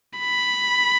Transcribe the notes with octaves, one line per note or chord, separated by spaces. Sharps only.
B5